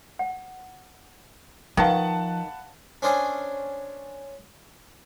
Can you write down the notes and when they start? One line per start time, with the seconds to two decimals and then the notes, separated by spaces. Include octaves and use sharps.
0.19 F#5
1.77 D#3 F3 B4 F5 F#5 A5 C#6 D#6
3.02 C#4 D4 C5 D#5 G#5